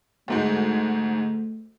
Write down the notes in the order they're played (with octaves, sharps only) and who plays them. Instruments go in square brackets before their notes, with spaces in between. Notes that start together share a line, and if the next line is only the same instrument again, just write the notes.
[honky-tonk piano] D2 G#2 G#3 [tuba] A3